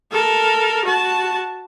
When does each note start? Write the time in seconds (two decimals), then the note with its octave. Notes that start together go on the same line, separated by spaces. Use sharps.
0.12 A4 A#4
0.85 F#4 A5